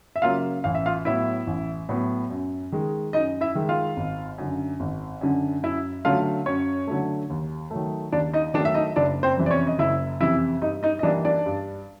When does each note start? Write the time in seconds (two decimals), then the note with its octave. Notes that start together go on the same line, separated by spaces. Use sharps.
0.16 E5
0.22 C#3 F#3 A#3 F4 F5
0.64 A1 F5
0.75 E5
0.86 F4 F5
1.05 A2 F#3 B3 E4 E5
1.47 A1
1.89 A2 F#3 B3
2.30 F#2
2.72 D#3 G#3
3.13 F#2 D#4 D#5
3.41 E4 E5
3.55 D#3 G#3
3.69 F4 F5
3.97 G#1
4.38 F#2 D3
4.80 G#1
5.21 F#2 D3
5.63 F#2 E4 E5
6.05 D3 F#3 A3 F4 F5
6.46 F#2 C#4 C#5
6.87 D3 F#3 A3
7.30 D#2
7.71 D#3 F#3 A3
8.12 D#2 D4 D5
8.33 D#4 D#5
8.54 D#3 F#3 A3 D4 D5
8.65 E5
8.74 D#4 D#5
8.96 F#1 D4 D5
9.23 C4 C5
9.37 F2 C3 E3
9.46 D5
9.51 C#4 C#5
9.67 D#5
9.79 F#1 E4 E5
10.20 F2 C3 E3 E4 E5
10.62 G2 D#4 D#5
10.83 D#4 D#5
10.99 D#5
11.03 E3 G3 A#3 D4 D5
11.25 D4 D5
11.46 G2